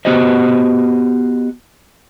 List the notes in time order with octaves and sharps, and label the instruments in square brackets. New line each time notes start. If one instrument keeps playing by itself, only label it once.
[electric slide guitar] B3 F#4 G4 C5 D#5